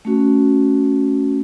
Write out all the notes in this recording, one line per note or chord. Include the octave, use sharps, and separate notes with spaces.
A3 C#4 F#4